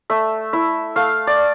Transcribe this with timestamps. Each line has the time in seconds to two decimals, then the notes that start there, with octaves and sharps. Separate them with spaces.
0.10 A3 E5
0.53 E4 E5
0.96 A3 F5
1.27 D5